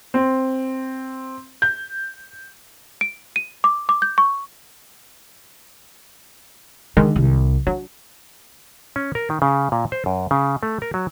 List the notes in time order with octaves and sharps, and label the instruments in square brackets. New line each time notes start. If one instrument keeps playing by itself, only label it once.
[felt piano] C4
G6
[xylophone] D7
D#7
D6
D6
G6
C#6
[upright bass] D3 [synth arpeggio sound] D#3 G#3
[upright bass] C2
[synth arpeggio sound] F#3 [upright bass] D4
[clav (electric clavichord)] C#4
A#4
D#3
C#3
A#2
C5
F#2
C#3
A3
A#4
F#3